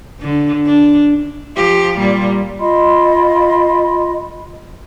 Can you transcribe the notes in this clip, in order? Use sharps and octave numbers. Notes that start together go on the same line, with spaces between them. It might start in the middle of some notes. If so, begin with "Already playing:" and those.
D3
D4
F3 G4
A#2 G3
F4 D#5 B5 C6